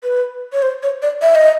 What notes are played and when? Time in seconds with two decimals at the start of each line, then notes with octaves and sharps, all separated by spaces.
0.03 B4
0.53 C#5
0.62 C5
0.83 C#5
1.02 D5
1.22 E5
1.35 D#5